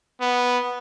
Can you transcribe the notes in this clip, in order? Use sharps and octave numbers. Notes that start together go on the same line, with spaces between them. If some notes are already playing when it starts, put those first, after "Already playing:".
B3